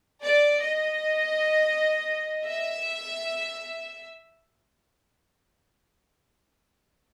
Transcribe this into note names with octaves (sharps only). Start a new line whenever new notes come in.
D5
D#5
E5